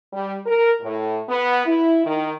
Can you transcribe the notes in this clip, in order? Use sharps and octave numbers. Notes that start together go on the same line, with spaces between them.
G3
A#4
A2
B3
E4
D#3